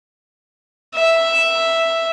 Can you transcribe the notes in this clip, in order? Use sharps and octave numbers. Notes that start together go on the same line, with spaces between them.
E5